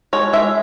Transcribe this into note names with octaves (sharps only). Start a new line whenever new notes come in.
G#3 C#5
G#3 E5